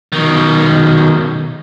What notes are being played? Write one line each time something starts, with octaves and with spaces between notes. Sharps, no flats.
B2 D#3